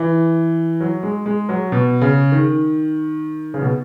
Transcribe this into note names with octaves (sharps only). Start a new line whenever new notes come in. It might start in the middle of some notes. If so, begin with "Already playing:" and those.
Already playing: E3
F#3
G#3
G#3
F#3
B2
C#3
D#3
C#3
B2